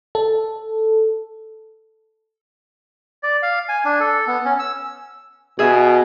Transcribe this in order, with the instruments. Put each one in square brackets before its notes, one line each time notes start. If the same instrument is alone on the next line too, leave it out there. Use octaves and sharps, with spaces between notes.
[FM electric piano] A4
[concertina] D5
F5
G#5
D4
A4
B3
C#4
E6
[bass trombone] B2 [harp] G#4 E5